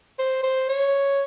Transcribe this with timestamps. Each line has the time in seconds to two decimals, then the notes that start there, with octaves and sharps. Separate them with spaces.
0.19 C5
0.43 C5
0.69 C#5